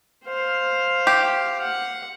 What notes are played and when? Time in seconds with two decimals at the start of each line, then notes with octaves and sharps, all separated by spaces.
0.25 C5 F5
1.07 G4
1.62 F#5